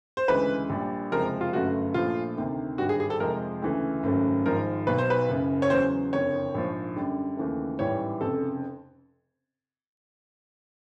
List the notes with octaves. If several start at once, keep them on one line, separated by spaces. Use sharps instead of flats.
C5
D2 C#3 E3 G#3 B4
A#1 A#2 G3
F#1 F2 C3 F3 G#3 A#4
F4
G1 F#2 D3 F#3 A3 F#4
A#1 A#2 F3 A3 F4
D2 C3 D#3
G#1 G2 D3 G3 F#4
G#4
G#4
A4
F2 C3 F3 G#3 A#4
D2 C#3 E3 A3
G#1 F#2 C#3 F#3 A3
G#1 G#2 F3 G#3 A#4
B1 B2 F#3 B4
C5
B4
F#1 F#2 C#3
C#5
E2 C#3 F#3 C5
F#1 F2 D3 C#5
A#1 G#2 F3
F#2 D3 G3
D#2 C#3 E3 A3
A1 G#2 E3 G3 C#5
F1 F2 C#3 A4